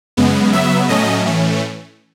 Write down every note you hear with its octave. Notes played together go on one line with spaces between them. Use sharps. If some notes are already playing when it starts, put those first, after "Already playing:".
F#2 C#3 G#3 B3
C#3 F#3 B3 E5
A2 F#3 A3 C#4 D#5
A2 E3 A3 C#4